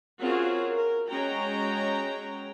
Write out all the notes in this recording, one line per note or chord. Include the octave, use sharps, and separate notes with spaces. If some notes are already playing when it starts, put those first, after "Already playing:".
C4 C#4 F4 F#4 G#4 A#4
A#4
G#3 C#4 F#4 G5 A#5